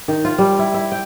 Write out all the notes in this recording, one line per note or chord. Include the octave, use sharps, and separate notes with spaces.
D#3
F4
G3
E4
E4
G5